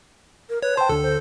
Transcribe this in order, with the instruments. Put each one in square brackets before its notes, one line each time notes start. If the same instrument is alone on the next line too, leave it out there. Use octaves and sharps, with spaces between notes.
[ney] A#4
[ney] B4 [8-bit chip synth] C#5
[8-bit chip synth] C5 [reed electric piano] G5 C6 [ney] A5
[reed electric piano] D2 D3 [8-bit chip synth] A4
[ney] C5